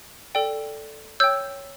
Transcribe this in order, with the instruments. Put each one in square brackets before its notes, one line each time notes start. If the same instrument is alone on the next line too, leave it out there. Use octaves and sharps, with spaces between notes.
[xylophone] A4 D5 G5
C#5 G5 E6 G6